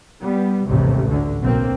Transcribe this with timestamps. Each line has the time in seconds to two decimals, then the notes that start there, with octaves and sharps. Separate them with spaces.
0.22 G3 B3
0.66 A1 D#2 G#2 C3
1.06 D2 D3
1.42 B1 A#3 C4